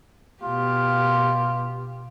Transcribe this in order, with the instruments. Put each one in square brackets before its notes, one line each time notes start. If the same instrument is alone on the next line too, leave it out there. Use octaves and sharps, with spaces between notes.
[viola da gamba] B2 G4 [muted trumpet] F4